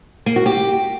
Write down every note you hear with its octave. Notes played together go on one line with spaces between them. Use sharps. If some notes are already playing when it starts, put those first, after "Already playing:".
A#3
F#4
G4